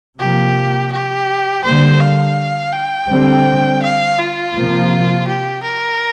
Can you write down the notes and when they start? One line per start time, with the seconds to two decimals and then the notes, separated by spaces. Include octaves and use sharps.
0.19 C3 F3 A#3 G4
0.92 G4
1.64 D3 G3 A#3 C5
2.00 F5
2.73 G5
3.09 D3 G3 C4
3.82 F5
4.19 F4
4.55 C3 F3 A#3
5.27 G4
5.63 A#4